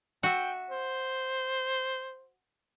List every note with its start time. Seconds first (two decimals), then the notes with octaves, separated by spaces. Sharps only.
0.23 F#4 E5 G5
0.70 C5